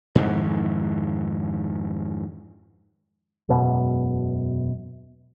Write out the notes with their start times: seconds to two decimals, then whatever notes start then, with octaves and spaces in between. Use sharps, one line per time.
0.15 F2 G#2 D#3 E3
3.49 E1 F#2 B2